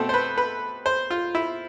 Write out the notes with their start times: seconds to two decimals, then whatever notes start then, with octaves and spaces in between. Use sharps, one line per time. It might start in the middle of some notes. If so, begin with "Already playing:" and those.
Already playing: B2 A3 C4 A4
0.09 C5
0.14 B4
0.38 B4
0.86 C5
1.11 F4
1.35 E4